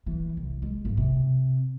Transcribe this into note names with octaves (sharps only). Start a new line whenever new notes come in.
E3
C2
G#3
G#1
C3